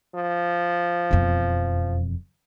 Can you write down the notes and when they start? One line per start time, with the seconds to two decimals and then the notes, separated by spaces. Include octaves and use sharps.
0.15 F3
1.11 E1 F2